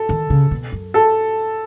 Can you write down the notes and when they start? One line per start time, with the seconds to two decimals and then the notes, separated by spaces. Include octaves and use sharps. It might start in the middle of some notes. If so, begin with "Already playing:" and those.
Already playing: A4
0.09 D#3
0.30 C#3
0.51 B2
0.72 F#2
0.94 A4